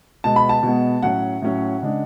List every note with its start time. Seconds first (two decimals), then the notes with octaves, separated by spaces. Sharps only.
0.24 B2 G#3 B3 A5
0.36 B5
0.49 A5
0.63 B2 G#3 B3
1.03 A2 F#3 C#4 F#5
1.42 A2 F#3 C#4
1.82 C#3 G#3 D4